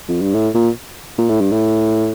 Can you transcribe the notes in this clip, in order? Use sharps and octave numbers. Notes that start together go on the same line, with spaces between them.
F2
G2
A2
A#2
A#2
A2
G2
A2